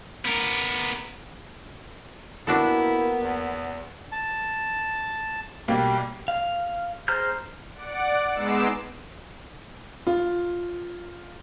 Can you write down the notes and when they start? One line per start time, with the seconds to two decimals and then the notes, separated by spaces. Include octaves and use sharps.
0.25 B3 A#4
2.47 A#3 B3 D4 E4 F#4 A4
3.20 E2
4.12 A5
5.68 B1 G3 A#3
6.28 F5
7.08 G#4 C5 A#5 F6 G6
7.73 D5 F#5 D7
8.33 G#3 B3 D#4 D6 E6 C7
10.07 F4